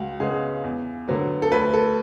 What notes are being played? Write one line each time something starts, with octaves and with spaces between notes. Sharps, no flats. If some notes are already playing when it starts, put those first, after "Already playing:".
Already playing: C#2 F#4
C#3 G#3 B3 G#4
E2
D3 F#3 B3
A4
D2 B4
A4